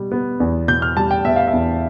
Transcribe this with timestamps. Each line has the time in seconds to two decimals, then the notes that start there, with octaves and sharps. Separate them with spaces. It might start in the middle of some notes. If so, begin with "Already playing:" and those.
Already playing: B2 G3
0.12 B3
0.40 E2
0.68 B2 G6
0.82 F6
0.96 G3 A5
1.11 G5
1.25 B3 E5
1.36 F5
1.48 E5
1.53 E2